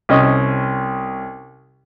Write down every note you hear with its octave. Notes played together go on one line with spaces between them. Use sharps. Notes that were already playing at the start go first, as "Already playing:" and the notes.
C2 C#4 D#5